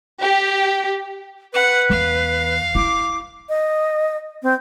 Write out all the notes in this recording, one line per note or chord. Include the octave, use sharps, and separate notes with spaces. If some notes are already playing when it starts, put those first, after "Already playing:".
G4
B4 F#5
E2 F5
E4 D6
D#5
C4